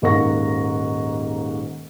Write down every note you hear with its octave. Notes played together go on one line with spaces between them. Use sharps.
D#1 G#2 A#3 F#5 C#6 A#6